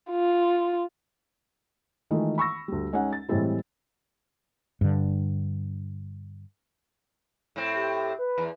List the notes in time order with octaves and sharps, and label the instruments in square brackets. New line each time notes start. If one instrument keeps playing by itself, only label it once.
[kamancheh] F4
[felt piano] D#3 E3 G#3 A3 D#4 F4
B5 C#6 E6 A#6
D2 G3
G#3 C#4 D#4 F#5
A6
A2 E3 G3 G#3 C4 E4
[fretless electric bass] G2 D3
[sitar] A2 C4
[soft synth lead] G4
B4
[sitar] E2